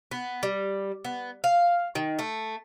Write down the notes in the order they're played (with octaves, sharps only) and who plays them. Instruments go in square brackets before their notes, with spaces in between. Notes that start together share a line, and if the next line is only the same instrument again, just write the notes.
[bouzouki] B3
G3
B3
F5
D#3
A3